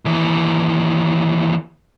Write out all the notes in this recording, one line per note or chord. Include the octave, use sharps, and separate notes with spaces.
D#2 E3